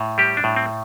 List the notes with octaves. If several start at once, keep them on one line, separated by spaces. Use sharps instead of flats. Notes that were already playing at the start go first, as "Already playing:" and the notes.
Already playing: A2
G3 G4
D4
A2
C4